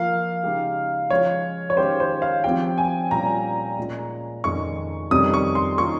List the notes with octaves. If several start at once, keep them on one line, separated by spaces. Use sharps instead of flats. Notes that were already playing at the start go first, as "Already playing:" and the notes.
Already playing: F3 A#3 F4 F5
C#3 G#3 D#4 G4
F3 G#3 C#4 C#5
C#5
D#3 G#3 C#4 G4 C5
C5
F5
F3 C4 G4 G5
G#5
A#2 G3 C#4 F4 A#5
A#2 G#3 C#4
F2 D#3 G#3 C#4 G#4 C#6
F2 C3 D#3 G3 C#4 D#6
C#6
C6
D#3 A#3 C#4 F4 C#6